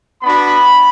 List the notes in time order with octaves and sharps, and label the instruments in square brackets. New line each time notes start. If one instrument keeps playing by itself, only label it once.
[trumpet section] B3 D4 F#4 B5